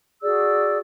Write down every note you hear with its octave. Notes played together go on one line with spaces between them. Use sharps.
F#4 G#4 D5 E6